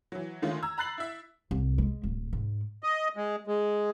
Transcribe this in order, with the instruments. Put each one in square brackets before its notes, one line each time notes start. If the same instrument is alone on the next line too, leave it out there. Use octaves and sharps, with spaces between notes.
[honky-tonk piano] E3 F#3
D3 D#3 G#3 A3 C#4 F4
A#5 E6 G#6
A#5 B5 F#6 A6 C7 F#7
E4 E5
[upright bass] C2
G#3
D1
G#2
[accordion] D#5
G#3
G#3